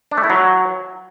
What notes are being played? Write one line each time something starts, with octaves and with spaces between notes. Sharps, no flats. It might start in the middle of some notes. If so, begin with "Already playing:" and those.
D4
A3
E4
F#3